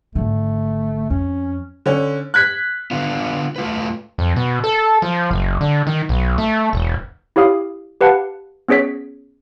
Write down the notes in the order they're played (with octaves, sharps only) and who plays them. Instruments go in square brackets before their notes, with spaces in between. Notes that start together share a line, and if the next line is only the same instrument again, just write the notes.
[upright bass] G#1 D3 [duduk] A3
[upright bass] F2 [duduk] C#4
[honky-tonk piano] D3 C#4
F#6 G#6 B6
[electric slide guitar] D3 B3 F4
A3 F4 B4
[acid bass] F2
B2
A4
F3
F#1
D3
D#3
B1
A3
E1
[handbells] E4 G4 C#5 F5 D#6
G4 B4 F5 F#5 A5
B3 C#4 G#4 C#5 B6